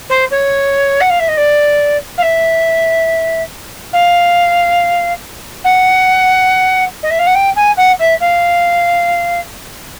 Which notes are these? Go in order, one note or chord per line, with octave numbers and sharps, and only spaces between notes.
C5
C#5
F#5
F5
E5
D#5
D5
F5
E5
F5
F#5
D#5
E5
F5
F#5
G5
G#5
F#5
E5
F5